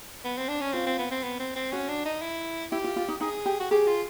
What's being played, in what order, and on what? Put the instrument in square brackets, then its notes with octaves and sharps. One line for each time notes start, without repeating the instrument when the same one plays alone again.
[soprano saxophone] B3
C4
D4
C#4
[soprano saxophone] C4 [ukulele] F4
[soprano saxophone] C4
B3
C4
B3
C4
C4
[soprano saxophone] C#4 [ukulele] F#4
[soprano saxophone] D4
D#4
E4
[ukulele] E4 [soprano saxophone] G4
[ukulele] F4
F4
D#4
[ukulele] D#4 [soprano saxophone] G#4
[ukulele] G4
[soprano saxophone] F#4
[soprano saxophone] G4 [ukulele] G#4
[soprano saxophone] F4